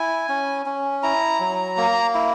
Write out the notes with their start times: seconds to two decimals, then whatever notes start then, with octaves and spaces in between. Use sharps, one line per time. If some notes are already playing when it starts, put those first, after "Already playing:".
Already playing: E4 G#5
0.29 C#4
0.66 C#4
1.03 E4 A#5
1.40 F#3
1.77 A#3
2.14 E4